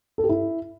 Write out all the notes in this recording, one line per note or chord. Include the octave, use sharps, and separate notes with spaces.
A4
G4
E4